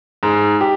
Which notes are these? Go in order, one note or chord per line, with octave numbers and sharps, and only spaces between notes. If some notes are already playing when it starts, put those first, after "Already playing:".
G#2
G4